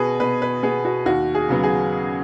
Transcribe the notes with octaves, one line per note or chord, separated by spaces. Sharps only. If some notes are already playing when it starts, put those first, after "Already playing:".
Already playing: B2 B3 F#4 G#4 B4
B2 B4
B4
B3 G#4
F#4
D#2 F#4
G#4
C#3 F#3 B3
G#4